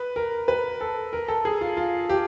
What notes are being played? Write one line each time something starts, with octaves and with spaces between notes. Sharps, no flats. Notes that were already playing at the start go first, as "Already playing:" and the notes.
Already playing: B4
A#4
B4
A4
A#4
A4
G#4
F4
F4
G4